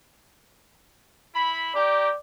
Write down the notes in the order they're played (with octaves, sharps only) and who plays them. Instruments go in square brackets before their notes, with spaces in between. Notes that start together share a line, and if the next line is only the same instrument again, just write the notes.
[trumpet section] E4 B5
[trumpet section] G4 G5 A#5 [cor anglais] D5